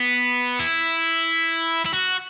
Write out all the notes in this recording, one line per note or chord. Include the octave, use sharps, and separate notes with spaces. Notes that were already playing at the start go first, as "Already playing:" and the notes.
Already playing: B3
E4
E4
F#4